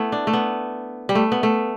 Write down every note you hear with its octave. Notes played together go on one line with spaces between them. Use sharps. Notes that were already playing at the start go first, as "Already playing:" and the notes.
Already playing: A3 B3 E4
D4
A3
B3
G3
A3
B3
A3